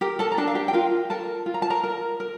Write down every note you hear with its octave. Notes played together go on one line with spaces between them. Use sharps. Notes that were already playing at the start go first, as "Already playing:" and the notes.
G4 A#4 G5
A4 A5
A#5
D4 A4 A5
F5
G4 G5
G5
F4 A#4 F5
A4 A#4 A5
F4
A#5
A5
A#4 A#5
A#4
A#4